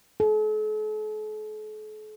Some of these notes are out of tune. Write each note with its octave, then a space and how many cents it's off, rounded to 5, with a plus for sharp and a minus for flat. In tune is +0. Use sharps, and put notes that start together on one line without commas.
A4 -45